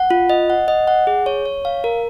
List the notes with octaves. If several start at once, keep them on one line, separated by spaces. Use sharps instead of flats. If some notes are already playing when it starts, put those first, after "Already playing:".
Already playing: F#5
F4
D#5
F#5
D#5
F#5
G#4
C#5
C#5
F5
A#4